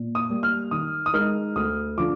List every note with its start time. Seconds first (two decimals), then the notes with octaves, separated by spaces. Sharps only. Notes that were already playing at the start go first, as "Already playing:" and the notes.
Already playing: A#2
0.15 D#6
0.30 G3 A#3
0.43 F6
0.71 D#3 D#6
1.06 D#6
1.13 G#3 D#4 A#4 D#5 F6
1.56 D2 D#6
1.97 D3 F3 D6